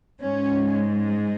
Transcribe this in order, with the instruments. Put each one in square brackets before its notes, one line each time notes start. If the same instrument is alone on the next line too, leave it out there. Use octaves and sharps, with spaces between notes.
[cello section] G#2 G#3 C#4